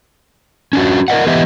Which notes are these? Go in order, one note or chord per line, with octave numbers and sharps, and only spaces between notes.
C#4 D4 F#4
A#4 D5 D#5 F#5
E3 B3 G4 B4 D#5 E5